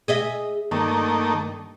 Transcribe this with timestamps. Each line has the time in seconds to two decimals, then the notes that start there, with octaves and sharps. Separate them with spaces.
0.08 G#4 D#5 E5
0.71 G2 D#3 A3 A#3